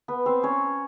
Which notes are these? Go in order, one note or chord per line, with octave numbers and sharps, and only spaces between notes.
B3 B4
C4 C5
C#4 C#5